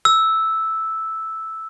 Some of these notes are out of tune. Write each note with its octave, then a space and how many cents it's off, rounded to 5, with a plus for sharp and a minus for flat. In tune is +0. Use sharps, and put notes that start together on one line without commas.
E6 -5